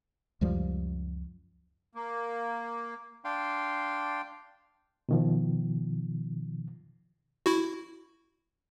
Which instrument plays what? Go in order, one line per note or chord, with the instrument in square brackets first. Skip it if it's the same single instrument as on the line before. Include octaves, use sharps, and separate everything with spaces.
[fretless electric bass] C#2 F#2 F3 G3
[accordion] A#3
[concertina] D4 F5 G5 C6
[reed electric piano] B2 D#3 F3
[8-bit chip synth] E4 F#4